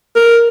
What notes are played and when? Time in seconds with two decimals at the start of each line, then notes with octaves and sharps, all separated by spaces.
0.16 A#4